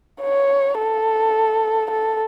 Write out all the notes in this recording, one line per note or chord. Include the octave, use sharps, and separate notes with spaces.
C#5
A4
A4